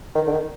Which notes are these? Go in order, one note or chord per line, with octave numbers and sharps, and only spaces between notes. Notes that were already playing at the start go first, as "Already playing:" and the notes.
D#3
D3
D#3